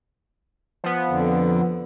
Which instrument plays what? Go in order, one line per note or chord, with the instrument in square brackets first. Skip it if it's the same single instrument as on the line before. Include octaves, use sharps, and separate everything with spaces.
[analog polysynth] F3 B3
[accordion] F2 D3